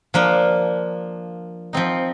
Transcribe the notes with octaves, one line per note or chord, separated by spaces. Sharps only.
F3 A#3 D4
F3 C4 D#4